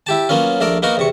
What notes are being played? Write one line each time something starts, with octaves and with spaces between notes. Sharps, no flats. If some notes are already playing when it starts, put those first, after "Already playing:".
E4 G4 A5
F#3 A#3 B3 C#4 F4
A#1 A3 A#4 D5
A#3 B3 D#4 F#4 A#4
E2 C3 C#6